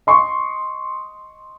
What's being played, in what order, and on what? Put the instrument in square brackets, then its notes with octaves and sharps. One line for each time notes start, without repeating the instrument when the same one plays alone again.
[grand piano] D#5 C6 C#6